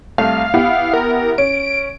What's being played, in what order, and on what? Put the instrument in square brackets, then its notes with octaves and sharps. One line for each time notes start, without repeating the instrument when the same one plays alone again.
[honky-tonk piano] C2 A3 [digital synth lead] F5
[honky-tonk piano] B3 E4 G4
[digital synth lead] A#4
[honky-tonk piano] C#4 [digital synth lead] D7